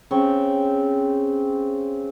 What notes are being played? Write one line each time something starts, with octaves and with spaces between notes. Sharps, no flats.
C#3 C4 G5 C#6